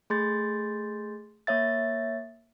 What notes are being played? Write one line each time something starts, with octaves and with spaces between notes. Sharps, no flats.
A3 G#4 C6 G6 A6
A#3 C#5 E5 A6